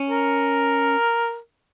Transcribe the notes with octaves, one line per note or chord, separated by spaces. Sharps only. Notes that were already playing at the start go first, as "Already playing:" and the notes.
Already playing: C#4
A#4